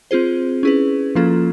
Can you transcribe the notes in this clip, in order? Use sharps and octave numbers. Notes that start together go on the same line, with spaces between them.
C4 F4 G#4 C5
C#4 E4 G#4 B4
F3 A#3 C#4 F4 A4